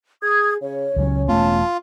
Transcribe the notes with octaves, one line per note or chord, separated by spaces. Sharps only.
G#4 D#6 G#6
C#3 C#5
C#2 C#3 F#3 C#4
E1 A3 B3 F4 A5